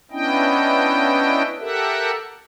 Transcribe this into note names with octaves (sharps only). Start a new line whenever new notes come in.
B3 C#4 D4 E4 D#5 G5
G4 A4 A#4 E5 F#5